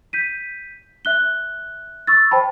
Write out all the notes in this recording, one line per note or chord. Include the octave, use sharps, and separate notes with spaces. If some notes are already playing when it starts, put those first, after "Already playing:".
G6 B6 D#7
E5 F#6 G7
C#6 E6 A6
C5 G5 A5 B5